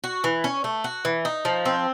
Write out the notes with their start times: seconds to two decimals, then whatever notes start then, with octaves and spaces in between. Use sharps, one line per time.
0.04 F#4
0.24 E3
0.44 C#4
0.64 A3
0.84 F#4
1.05 E3
1.25 D#4
1.45 F3
1.65 C4